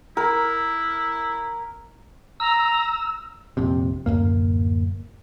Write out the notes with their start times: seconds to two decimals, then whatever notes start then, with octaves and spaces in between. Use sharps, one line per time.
0.17 E4 A#4
2.40 A#5 E6
3.57 A#1 F2 C3
4.06 D1 G#1 F#2 A#3